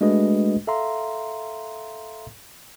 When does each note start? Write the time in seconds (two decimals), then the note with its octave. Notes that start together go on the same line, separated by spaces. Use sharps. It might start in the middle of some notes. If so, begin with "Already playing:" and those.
0.01 G#3 A3 D4 F#4 B4 D#5
0.67 A4 E5 F5 A#5 C6